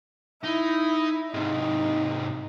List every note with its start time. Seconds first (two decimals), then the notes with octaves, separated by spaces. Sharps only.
0.44 D#4 E4
1.34 G#2 C3 D#4